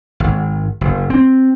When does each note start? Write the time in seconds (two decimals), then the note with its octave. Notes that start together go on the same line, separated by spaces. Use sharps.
0.20 G#1
0.81 F#1
1.10 C4